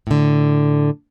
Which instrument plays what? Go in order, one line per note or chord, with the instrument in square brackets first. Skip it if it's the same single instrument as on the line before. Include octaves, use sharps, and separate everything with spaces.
[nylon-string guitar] A2 D3